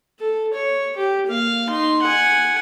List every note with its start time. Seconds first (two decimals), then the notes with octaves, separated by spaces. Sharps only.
0.20 A4
0.54 C#5
0.97 G4
1.27 A#3 F5
1.69 D#4 C6
2.02 F#5 G#5